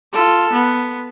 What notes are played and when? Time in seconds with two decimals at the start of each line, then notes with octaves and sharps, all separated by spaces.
0.13 F4 A4
0.53 B3